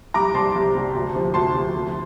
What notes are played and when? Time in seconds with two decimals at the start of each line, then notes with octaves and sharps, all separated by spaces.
0.14 C2 A#5 D6
0.34 C3 G3 A5 C6
0.55 C2
0.75 C3 G3
0.95 D2
1.15 C3 F3
1.34 D2 A5 C6
1.54 C3 F3
1.74 D2